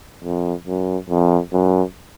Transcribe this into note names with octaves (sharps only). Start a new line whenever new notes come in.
F2
F#2
F2
F#2